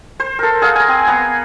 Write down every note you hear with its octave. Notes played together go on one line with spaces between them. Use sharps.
C5
A4 A#4
G#4 F5 F#5
G#5 A#5
C4 G#5
B3 A#5